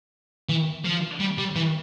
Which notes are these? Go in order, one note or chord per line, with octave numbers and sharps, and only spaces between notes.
E3
F3
G3
G3
E3